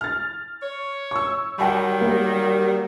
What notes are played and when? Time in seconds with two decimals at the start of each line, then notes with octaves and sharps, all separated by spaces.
0.01 F6 A6
0.62 C#5
1.11 C#6 E6
1.58 D#3 F#3 G3 F#5 G5 B5
2.01 A#3 G4